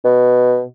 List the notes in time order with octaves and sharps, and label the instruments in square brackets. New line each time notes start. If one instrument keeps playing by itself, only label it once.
[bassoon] B2